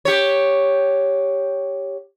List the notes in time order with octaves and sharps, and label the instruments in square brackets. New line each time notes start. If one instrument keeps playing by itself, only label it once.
[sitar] G4 C#5